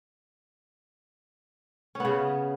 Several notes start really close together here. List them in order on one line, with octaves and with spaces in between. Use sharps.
C#4 B3 C#3